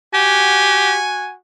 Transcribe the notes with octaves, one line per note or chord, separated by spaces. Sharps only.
F#4 G4 F#5 G#5